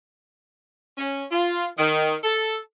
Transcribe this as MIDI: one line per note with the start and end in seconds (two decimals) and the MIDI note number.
0.98 1.24 61
1.31 1.67 65
1.78 2.15 51
2.23 2.57 69